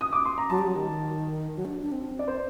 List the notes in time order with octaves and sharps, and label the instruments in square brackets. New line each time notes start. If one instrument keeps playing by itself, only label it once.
[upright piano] D#6
D6
C6
A#5
[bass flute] F#3 [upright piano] A5
[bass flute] G3
F#3
D#3
F#3
D4
D4
C4
[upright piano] D5
C5